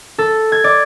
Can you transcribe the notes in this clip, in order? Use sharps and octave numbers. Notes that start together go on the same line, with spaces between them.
A4
G#6
D5